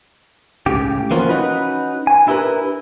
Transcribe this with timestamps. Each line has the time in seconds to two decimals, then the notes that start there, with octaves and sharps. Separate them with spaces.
0.66 C#2 A2 C#3 G4
1.11 E3 F3 A#3 B3 C#4 F4
1.29 C#4 D#4 F#4 B4
2.07 G#5
2.27 D4 E4 G4 G#4 A#4 B4